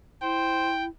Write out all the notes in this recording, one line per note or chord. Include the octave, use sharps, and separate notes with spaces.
E4 C5 G5